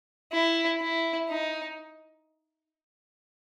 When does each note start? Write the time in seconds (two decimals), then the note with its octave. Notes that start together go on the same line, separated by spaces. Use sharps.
0.32 E4
0.81 E4
1.29 D#4